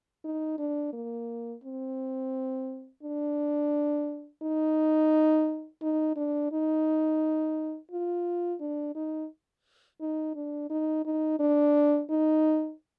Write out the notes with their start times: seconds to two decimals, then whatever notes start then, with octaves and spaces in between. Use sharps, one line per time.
0.24 D#4
0.58 D4
0.93 A#3
1.64 C4
3.03 D4
4.42 D#4
5.82 D#4
6.16 D4
6.52 D#4
7.91 F4
8.60 D4
8.95 D#4
10.00 D#4
10.35 D4
10.70 D#4
11.05 D#4
11.39 D4
12.10 D#4